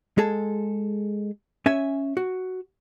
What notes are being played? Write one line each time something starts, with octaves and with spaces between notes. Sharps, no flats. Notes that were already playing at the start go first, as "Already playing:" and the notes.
G#3 G#4 A4
C#4 E5 G#5
F#4